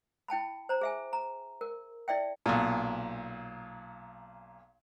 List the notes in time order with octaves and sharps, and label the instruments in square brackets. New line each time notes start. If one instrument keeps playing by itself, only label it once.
[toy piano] E4 G5 A5 B5
C5 A#5
G#4 E5 G#5
A#5
A#4
E4 D5 E5 G5
[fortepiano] B1 A#2